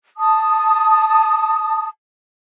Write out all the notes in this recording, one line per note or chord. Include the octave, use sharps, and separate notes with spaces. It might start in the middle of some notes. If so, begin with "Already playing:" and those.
A5 D#6